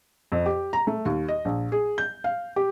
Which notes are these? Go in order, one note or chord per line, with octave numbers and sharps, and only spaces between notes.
F2
G4
A#5
A3
D#2
D#5
A#1
G#4
G6
F5
G4